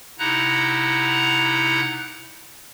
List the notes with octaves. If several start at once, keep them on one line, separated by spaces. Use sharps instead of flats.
C3 D#4 E4 F#5 A#5 F#6